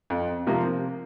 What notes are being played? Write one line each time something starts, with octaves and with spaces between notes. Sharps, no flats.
F2
C3 F3 A#3